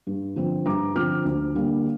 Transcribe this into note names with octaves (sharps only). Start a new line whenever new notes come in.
G2
D3 F3 C4
G2 A#5 D6
D3 F3 C4 D6 F6
D2
D3 G3 A#3